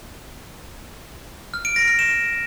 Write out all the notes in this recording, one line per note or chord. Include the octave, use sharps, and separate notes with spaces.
F6
D7
A#6
F6
E7